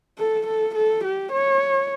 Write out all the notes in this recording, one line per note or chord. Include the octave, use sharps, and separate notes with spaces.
A4
A4
A4
G4
C#5